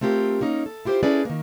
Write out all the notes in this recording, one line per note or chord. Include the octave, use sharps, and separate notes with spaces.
A3 C4 F4 G4 A#4
A#3 C#4 D#4
A4
E4 F4 G4 A#4 C5
C#4 E4 G#4 A4 B4 D5
D#3 A#3